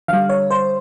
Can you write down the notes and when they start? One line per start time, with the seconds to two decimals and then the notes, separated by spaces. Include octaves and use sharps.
0.08 D3 G3 F5
0.29 C#5
0.51 C5